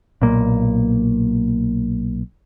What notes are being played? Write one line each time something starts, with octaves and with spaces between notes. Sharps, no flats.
B1 A#2 A#3